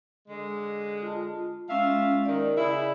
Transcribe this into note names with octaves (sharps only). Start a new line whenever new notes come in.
D3 G#3
F4 A5
G#3 C#4 F4 E5 F5
D#2 D#3 D5
C#3 E4